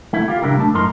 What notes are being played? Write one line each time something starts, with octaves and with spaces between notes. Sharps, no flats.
A3 E4
F4 G4
C#3 G3 D4 E4 G4 A#4
A3 D4 A5
F#2 A2 D#4 A#4 C6